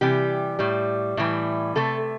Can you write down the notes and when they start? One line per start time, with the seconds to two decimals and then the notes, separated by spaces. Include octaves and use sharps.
0.01 C3 E3 G3 G4
0.59 A2 G3
1.17 A2 E3 G3
1.75 C3 A3 A4